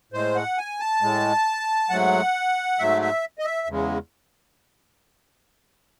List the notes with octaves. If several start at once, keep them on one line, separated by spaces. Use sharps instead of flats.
A2 G#3 C5
F#5
G#5
A5
A2 G#3
G#2 F#3 A3 F#5
G#2 F#3 A3 E5
E5
D#5
E5
E2 C#3 G#3